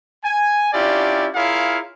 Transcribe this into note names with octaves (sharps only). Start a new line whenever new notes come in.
G#5
C#4 D4 E4 F4 G4 D5
E4 F4 G#4 A#4 C#5 F5